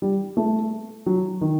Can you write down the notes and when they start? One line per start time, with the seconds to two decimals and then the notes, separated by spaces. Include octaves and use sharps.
0.02 G3
0.37 A3
1.06 F#3
1.41 D#3